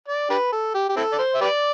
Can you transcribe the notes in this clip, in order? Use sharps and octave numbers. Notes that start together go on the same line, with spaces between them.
D5
D4 G4 B4
A4
G4
G4
C4 E4 A4
D5
C5
E5
G4 B4 D5